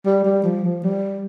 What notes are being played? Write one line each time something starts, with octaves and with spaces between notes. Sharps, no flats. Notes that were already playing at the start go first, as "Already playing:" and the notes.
G3
G3
F3
F3
G3